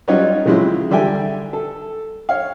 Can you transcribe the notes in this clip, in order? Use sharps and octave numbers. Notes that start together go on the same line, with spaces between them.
F#3 G3 C#4 D#4 F4 C#5
C#3 F3 F#3 G#3 C4 E4
D3 G3 E5 G5 G#5
A4
C#5 F5